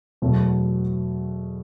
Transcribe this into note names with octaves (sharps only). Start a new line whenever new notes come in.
E2 B2 F#3 A3